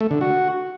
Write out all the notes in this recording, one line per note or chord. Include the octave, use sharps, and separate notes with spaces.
A3
D3
F#4